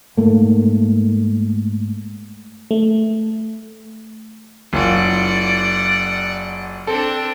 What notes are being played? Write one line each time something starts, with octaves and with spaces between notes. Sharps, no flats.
G#2 A3 A#3
A3
F#1 F4 D5 F#5
C4 D4 A4